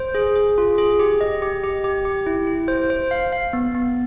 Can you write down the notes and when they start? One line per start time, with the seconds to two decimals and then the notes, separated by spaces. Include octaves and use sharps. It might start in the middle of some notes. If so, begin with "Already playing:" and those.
Already playing: C5
0.15 G#4
0.36 G#4
0.58 F4
0.78 G#4
0.99 G4
1.21 D#5
1.42 G4
1.63 G4
1.84 G4
2.05 G4
2.26 E4
2.47 E4
2.68 C5
2.90 C5
3.11 F5
3.33 F5
3.53 B3
3.75 B3